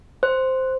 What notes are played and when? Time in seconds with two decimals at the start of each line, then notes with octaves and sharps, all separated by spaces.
0.23 C5